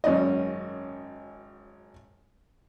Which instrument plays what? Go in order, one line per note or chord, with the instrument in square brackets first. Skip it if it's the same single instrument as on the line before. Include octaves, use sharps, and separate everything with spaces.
[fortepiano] G#1 F#2 C#4 D5 D#5